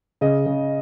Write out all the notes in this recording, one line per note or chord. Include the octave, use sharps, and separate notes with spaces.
C#3 D#5
C#3